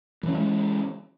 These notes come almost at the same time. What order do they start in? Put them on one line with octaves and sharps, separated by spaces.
E3 C#4 F3 G#3